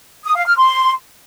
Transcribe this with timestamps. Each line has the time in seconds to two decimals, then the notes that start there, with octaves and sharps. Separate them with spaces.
0.24 D#6
0.35 F5
0.46 F6
0.57 C6